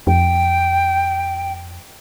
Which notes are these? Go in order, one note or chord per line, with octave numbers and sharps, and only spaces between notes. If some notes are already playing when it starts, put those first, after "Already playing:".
F2 G5